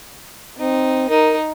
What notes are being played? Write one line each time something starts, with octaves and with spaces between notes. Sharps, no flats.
C4 D#4
D#4 A#4